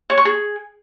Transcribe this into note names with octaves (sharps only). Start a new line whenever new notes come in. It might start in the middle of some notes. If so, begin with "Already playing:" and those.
C#5
C#6
G#4